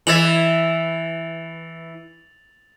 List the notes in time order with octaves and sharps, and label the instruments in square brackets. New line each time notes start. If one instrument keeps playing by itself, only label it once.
[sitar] E3 E4 E5 [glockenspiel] A6 F7 F#7